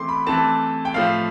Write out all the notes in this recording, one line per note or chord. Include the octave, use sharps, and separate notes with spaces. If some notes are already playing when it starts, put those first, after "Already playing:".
Already playing: E3 A3 C4 C6 D6
B5
E3 A3 C4 A5
G5
A2 F3 A3 F5